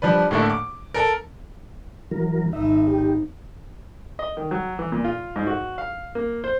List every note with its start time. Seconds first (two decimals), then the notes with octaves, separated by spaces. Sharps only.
0.02 F3 G3 D4 B4
0.31 A2 D3 A3 A#3 E4
0.50 D6
0.94 A4 A#4
2.11 E3 F#3 A#4
2.53 G#1 D#4 E5
2.87 G4
4.19 D#5
4.37 D#3
4.51 F#3
4.79 E3
4.92 A#2
5.04 F4
5.36 G#2
5.47 F#4
5.78 F5
6.15 A#3
6.44 C5